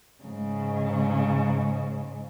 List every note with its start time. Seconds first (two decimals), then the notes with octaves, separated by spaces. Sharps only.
0.24 G#2 C#3